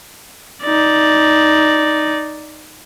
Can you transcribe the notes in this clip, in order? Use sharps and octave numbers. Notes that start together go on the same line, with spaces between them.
D#4 D5